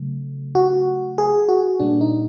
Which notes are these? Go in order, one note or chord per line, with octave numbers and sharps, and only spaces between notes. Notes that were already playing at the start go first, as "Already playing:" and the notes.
Already playing: C#3 F#3 A3
F#4
G#4
F#4
A#2 G3 A#3 D4
D#4